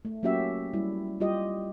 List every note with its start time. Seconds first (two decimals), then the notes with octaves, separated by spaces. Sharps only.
0.05 A3
0.23 F#3 A#3 C#4 F#4 G4 E5
0.73 G3 E4
1.20 G3 F4 G4 D#5